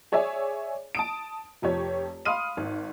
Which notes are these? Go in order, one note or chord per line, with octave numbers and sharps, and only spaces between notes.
G#4 C#5 D5 E5 G#5
A5 D#6 D7
F1 F2 G4 C#5
F5 B5 C6 D#6 F6 D#7
G#1